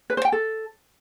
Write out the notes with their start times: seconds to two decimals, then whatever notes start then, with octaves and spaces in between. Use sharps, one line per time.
0.10 B4
0.17 C5
0.25 G5
0.32 A4